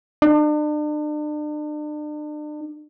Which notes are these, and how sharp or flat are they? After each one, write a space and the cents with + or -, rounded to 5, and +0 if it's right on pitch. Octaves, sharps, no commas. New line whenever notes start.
D4 +40